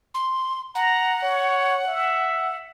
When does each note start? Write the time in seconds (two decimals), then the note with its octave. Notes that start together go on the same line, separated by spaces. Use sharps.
0.14 C6
0.75 F#5 A#5
1.22 C#5
1.87 E5